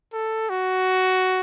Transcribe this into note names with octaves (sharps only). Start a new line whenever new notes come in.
A4
F#4